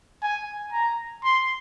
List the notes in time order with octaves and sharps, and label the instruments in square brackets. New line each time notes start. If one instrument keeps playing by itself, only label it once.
[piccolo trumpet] G#5
A#5
C6